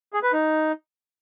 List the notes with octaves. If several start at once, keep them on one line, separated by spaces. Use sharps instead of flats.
G#4
B4
D#4